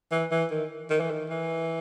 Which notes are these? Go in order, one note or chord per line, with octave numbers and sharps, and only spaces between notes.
E3
E3
D#3
D#3
E3
D#3
E3